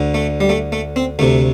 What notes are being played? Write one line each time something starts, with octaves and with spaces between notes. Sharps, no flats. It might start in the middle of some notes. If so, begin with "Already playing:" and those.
Already playing: D2 D3
A3
G3
A3
A3
C4
D2 C3 A3